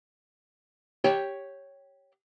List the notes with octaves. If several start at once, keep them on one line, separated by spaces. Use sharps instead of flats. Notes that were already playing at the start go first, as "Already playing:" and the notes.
G4 C#5 G5